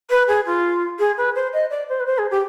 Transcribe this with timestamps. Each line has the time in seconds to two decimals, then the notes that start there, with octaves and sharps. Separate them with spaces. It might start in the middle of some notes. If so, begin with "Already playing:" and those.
0.10 B4
0.27 G#4
0.46 F4
0.99 G#4
1.17 B4
1.35 C5
1.53 D#5
1.70 D5
1.89 C5
2.00 B4
2.06 C5
2.18 G#4
2.30 G4